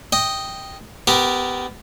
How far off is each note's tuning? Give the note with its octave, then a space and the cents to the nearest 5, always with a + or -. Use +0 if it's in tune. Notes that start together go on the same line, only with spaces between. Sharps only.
D#5 +0 G5 +0
B3 +20 G4 +0 A#4 +0